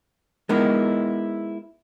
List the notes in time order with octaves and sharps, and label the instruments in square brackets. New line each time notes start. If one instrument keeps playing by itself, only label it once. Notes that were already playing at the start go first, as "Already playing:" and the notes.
[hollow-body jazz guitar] G#3 B3 D#4 E4 A#4